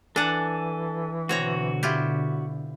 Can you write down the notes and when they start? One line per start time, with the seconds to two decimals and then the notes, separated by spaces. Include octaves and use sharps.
0.16 E3 D4 A4 F#5 G#5 A5
1.29 B2 D3 C4 F#4 C#5 A#5
1.83 E4 F4 G4